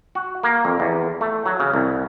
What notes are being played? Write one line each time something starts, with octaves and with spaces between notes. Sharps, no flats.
F#4
A#3
F2
E2
A3
F#3
C#3
C2